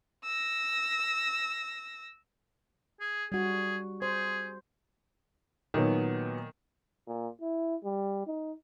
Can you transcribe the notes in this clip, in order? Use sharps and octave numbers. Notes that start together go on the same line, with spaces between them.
E6 A#6
G#4
G3 F#4 G#4
G#4 C5
A#2 D#3 F#3 B3
A#2
E4
G3
D#4